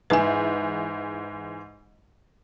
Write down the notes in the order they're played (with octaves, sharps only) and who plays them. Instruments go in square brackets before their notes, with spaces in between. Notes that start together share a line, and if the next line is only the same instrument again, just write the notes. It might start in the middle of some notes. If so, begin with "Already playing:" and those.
[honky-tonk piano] G#2 E3 [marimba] B4 G#5